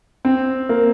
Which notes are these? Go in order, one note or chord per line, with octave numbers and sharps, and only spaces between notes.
C4
A#3